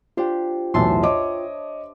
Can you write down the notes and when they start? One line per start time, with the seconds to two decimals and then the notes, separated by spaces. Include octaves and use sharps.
0.17 D4 F4 G4 C5 G5
0.74 B1 E2 A2 E5 A5 C6
1.03 C#5 D#5 D6